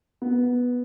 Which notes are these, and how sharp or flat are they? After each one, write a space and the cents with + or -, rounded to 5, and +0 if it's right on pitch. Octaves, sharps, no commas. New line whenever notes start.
B3 -5